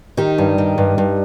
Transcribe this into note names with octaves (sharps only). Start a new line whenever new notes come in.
D#3 D#4 G4
G2
D#3
G2
G2